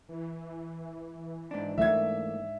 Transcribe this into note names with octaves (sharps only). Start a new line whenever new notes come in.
E3
G#2 D4
E3 A3 A#3 E5 G#6